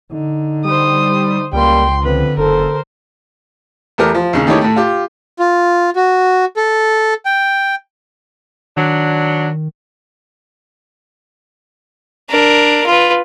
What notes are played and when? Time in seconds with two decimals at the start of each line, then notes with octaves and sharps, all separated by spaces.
0.12 D3 D#4
0.65 G3 C5 D#6
1.53 C#2 G3 A#3 G5 C6
2.03 D3 F3 C4 B4
2.38 F#1 A4 A#4 C5
3.98 E2 A3 G4 A#4
4.15 F3
4.33 D#2 C#3
4.47 D#3 A3 D#4 E4 G4 C#5
4.61 A2 A3
4.76 F4 G4
5.39 F4
5.96 F#4
6.57 A4
7.25 G5
8.77 D#3 F#3 D4
12.29 D4 A#4
12.86 F4 B4